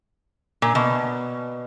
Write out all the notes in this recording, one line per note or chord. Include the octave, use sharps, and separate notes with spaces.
A#2
B2